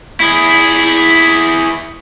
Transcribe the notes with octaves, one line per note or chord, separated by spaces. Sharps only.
E4 G#4